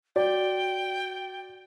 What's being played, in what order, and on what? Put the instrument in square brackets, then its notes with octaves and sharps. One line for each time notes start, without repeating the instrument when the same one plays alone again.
[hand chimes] F#4 [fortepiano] D5 [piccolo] G5